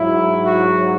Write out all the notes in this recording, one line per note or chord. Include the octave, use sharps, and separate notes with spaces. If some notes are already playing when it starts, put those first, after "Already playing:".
Already playing: G#2 F#3 E4
F#4